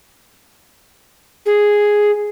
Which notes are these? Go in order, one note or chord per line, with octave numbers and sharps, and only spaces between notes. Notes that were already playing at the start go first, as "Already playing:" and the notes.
G#4